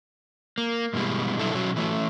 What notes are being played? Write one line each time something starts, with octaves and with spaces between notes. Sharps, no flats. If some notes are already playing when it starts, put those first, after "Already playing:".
A#3
G2 B2 E3 G3 G#3
B2 F#3 D4 E4 A4
B2 F#3 C#4 F#4
E3 A3 C#4